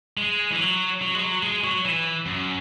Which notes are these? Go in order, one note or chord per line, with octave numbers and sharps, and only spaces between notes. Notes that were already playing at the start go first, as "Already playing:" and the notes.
G#3
E3
F#3
F#3
G#3
F#3
G#3
F#3
E3
F#2